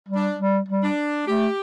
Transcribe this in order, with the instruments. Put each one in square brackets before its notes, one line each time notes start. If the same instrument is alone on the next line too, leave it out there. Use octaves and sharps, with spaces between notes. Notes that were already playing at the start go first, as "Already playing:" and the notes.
[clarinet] G3
[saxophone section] D4
[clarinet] G3
G3
[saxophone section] D4
[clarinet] A3 [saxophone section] G4